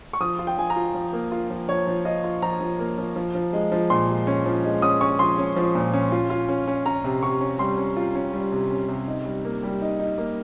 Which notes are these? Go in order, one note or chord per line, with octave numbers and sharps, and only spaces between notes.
C#6
F3 D#6
F4
G5
F3 G#5
A#5
F4
F3
A#3
F4
F3
F3 C#5
F3
F4 D#5
F4
F3 A#5
F3
A#3
F3
F3
F3
G#3
F3
A#2 C6
G#3
C#4
F3
G#3
C#4 D#6
C#4 C#6
F3 C6
C#4
F3
A#2
C#4
F4
F4
C#4
C#4
C#4 A#5
C3
C3 C#6
C#4
G3 C6
C#4
F4
C#4
G3
C3
C#4
C3
D#4
G3
A#3
G3
D#4
D#4
A#3